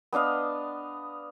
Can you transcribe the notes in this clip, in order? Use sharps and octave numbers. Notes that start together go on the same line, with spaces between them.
B3 D4 D#5 F5